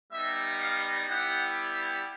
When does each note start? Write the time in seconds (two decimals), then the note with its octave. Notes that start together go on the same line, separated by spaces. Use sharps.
0.12 G3 B3 D#4 E5
0.60 F5
1.08 G3 B3 E4 G4 F#5